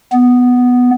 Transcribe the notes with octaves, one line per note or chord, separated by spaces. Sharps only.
B3